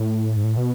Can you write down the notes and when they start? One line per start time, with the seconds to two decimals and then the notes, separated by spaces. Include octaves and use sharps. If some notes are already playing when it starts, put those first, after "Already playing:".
Already playing: A2
0.36 G#2
0.44 A2
0.57 B2